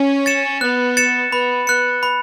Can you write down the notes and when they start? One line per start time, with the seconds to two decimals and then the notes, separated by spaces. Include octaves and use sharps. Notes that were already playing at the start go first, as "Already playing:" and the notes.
Already playing: C#4
0.26 A6 C#7 E7
0.61 B3 F#6
0.97 A6 C#7 E7
1.32 B3 B5
1.67 B3 F#6 C#7
2.03 B5